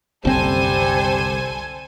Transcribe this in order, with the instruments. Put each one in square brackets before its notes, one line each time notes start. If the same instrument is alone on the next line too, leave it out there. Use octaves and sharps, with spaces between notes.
[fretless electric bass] F#1 C4 [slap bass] C2 D3 [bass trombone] G3 [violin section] A4 C5 G#5